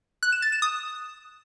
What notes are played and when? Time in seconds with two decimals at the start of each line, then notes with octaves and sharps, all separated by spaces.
0.23 F#6
0.32 E7
0.42 A6
0.52 E7
0.62 D#6